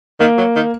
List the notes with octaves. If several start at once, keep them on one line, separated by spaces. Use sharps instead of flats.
D#3 A#3
F#3
D#3